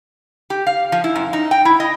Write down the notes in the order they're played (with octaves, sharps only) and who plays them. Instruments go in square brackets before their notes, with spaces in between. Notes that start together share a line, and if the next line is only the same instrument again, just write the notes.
[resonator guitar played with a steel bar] G4
F5
F3
E4
F#2
D#4
G5
E4
D#5